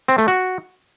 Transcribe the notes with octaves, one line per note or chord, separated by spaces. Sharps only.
C4
A3
F#4